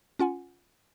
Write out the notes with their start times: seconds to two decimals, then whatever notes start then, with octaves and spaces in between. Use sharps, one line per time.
0.19 C#4 F4 F#5 G#5